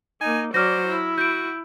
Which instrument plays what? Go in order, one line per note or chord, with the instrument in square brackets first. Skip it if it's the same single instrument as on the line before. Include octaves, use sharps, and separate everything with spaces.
[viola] A#3 D#4 [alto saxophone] G#5
[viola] F#3 D5 [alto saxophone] C5 [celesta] F6 A#6
[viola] E4
[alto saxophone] F#4 [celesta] G6 D7